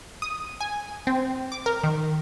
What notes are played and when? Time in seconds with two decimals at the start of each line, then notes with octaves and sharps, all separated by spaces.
0.22 D#6
0.61 G#5
1.07 C4
1.52 D6
1.66 A#4
1.84 D#3